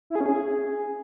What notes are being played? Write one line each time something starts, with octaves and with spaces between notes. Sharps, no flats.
E4
G#4
C#4
G#4